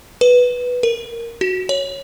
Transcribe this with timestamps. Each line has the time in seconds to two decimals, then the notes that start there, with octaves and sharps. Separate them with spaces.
0.21 B4
0.83 A#4
1.41 F#4
1.69 C#5